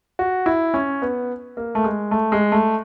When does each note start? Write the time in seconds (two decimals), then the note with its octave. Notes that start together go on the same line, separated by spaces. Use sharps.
0.19 F#4
0.46 E4
0.74 C#4
1.02 B3
1.57 A#3
1.75 A3
1.84 G#3
2.11 A3
2.32 G#3
2.52 A3